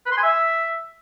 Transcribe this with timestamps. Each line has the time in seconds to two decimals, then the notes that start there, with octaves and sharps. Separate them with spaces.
0.06 B4
0.12 C6
0.17 G#5
0.23 E5